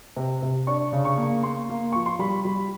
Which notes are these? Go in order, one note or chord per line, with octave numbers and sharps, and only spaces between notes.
C3
C3
D4 C#6
C#3
C#6
A#3
A#3 C6
A#3
F3 C#6
C6
G3 B5
G3